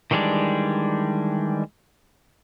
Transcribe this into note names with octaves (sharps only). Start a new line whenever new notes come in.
D#3 E3 G3 G#3 D4